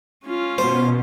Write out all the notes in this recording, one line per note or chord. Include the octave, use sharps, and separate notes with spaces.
C#4 F4
B2 C5